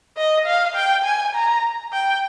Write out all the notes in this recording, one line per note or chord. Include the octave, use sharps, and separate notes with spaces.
D#5
F5
G5
G#5
A#5
G5